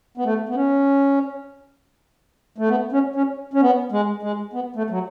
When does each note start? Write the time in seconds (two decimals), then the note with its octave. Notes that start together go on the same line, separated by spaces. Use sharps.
0.17 B3
0.25 A3
0.49 B3
0.55 C#4
2.58 A3
2.69 B3
2.92 C#4
3.16 C#4
3.54 C#4
3.62 B3
3.92 G#3
4.23 G#3
4.53 B3
4.76 A3
4.90 F#3